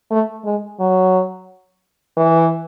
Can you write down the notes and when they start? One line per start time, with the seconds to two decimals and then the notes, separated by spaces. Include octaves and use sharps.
0.11 A3
0.45 G#3
0.80 F#3
2.17 E3